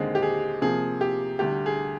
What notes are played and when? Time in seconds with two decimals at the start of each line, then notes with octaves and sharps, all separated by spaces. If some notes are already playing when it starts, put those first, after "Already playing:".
Already playing: D#2 D3 G#3 C4 G#4
0.15 G4
0.22 G#4
0.61 C3 F3 A#3 G#4
1.01 G4
1.39 D2 D3 G3 G4
1.66 G#4